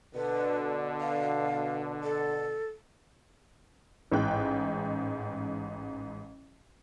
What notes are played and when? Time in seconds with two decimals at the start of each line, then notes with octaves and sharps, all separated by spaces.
0.15 B2 D3 B4
1.01 F5
2.04 A4
4.12 A1 G#2 G5 F#6